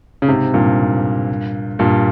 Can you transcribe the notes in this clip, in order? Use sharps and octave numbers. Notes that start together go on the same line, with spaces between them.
C#3
G#2 C3
G2 A#2
G2 A#2